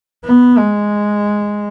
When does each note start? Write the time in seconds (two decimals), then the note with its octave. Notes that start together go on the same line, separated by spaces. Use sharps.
0.24 B3
0.58 G#3